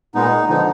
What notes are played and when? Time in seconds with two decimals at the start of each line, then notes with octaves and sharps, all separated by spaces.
0.15 A#2 G#3 B3 D#4
0.48 D3 F3 B3 D#4